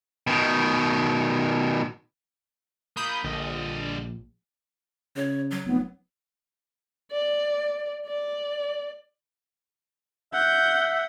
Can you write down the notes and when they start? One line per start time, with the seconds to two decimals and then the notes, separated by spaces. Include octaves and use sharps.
0.27 B2 D#3
2.96 F3 A#3 B5 D#6 G6
3.24 A#1 D3 G3 D#5
5.16 C#3 C#5
5.51 F#3
5.66 F1 B3
7.11 D5
8.07 D5
10.33 E5 F#5 G6